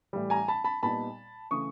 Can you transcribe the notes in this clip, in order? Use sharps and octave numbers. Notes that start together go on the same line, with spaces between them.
A2 E3 G3
G#5 A#5
A5 B5
A5 B5
A#2 G3 B3 D#4 A5 B5
C#3 E3 A3 C#6 D#6